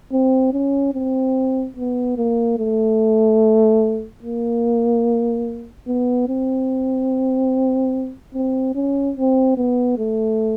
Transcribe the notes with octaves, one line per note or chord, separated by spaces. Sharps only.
C4
C#4
C4
B3
A#3
A3
A#3
B3
C4
C4
C#4
C4
B3
A3